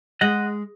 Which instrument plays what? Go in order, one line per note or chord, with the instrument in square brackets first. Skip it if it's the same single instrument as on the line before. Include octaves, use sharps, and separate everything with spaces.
[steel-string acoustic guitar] G#3 [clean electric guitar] D#5 F#5